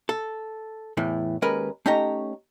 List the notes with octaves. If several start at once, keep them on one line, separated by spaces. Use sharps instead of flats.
A4
E2 A2 E3 A3
D#2 G#3 C#4 A#4 B4
A3 C#4 D#4 G4 C#5 A#5